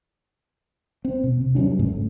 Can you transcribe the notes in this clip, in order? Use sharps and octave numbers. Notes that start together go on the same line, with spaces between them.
C4
B2
C3
G2 F#3 C#4 D4
G#2 C#3 A3